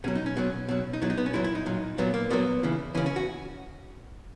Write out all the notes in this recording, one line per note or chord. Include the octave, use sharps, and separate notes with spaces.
B2 F#3 C#4
D#4
C#4
B2 F#3
B2 F#3
D#4
B2 F#3 E4
D#4
B3
C#4
A#2 F#3 E4
E4
D#4
A#2 F#3
A#2 F#3 B3
A#3
A#2 F#3 B3
C#3 E3
C#3 E3 C#4
C#4
F#4